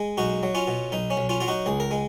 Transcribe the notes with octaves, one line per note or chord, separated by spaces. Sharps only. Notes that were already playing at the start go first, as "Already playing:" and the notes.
Already playing: G#3
B1 D#4 F#4
F#3
C#4 F4
B2
B1 D#4
C#4
B1
C#4 F4
F#3 F4
D#4 F#4
C#2 G#4
A#4
G#3